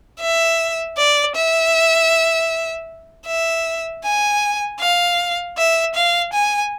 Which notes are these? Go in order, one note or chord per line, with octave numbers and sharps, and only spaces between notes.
E5
D5
E5
E5
G#5
F5
E5
F5
G#5